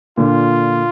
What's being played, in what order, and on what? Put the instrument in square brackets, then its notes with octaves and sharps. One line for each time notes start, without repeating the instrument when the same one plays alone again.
[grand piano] A#2 D3 [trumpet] F4